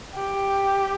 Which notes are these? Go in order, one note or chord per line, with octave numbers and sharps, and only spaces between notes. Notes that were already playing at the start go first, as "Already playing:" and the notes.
G4